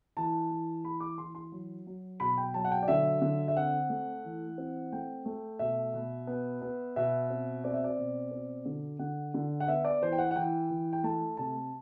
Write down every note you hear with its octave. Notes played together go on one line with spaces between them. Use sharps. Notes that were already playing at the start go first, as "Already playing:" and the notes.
E3 A5
E3
E3 B5
D6
E3 C6
C6
F#3
F#3
B2 B5
G5
F#3 A5
F#5
G5
D5
D3 E5
D3
E5
C4 F#5
A3
E3
C4
A3 G5
A3
B2 E5
B2
B3
B3
B2 E5
C4
C4 D5
E5
D5
B2
C4
D3
D3 F#5
D3
F#5
B3 E5
D5
E3 C5
G5
F#5
F#5
E3 G5
E3
G5
A3 A5
C3 A5